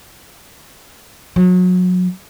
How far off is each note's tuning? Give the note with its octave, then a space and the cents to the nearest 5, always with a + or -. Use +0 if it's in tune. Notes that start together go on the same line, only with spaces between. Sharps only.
F#3 -30